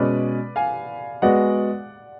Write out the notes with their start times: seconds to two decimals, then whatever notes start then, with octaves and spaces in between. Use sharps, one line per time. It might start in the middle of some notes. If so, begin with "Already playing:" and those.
Already playing: B2 G#3 C#4 B4 D5
0.56 F5 G#5
1.22 G#3 B3 F#4 D5 F#5